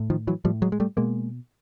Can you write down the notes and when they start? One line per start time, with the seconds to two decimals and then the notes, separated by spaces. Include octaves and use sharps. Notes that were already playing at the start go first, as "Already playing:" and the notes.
Already playing: A2
0.10 D#3 F3
0.27 E3 F#3
0.45 A2 F3 G3
0.62 F#3 G#3
0.72 G#3
0.80 G3 A3
0.97 B2 G#3 A#3